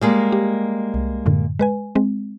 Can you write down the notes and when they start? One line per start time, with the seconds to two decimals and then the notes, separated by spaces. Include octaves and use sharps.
0.01 G3 G#3 A#3
0.32 G4
0.94 C2
1.26 F#2 A2 D3
1.59 G#3 B4 G#5
1.95 G#3 C4